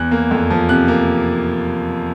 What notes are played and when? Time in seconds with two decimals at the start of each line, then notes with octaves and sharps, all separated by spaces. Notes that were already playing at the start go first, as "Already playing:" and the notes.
Already playing: E2 F#6
0.11 A#3
0.31 F2
0.50 F3
0.69 C3 F#6
0.88 A#3